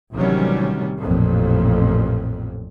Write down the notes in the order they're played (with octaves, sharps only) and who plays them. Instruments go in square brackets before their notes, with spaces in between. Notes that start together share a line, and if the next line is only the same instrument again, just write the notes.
[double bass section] A1 C3 D#3 F#3 G3 C#4
A1 F2 A#2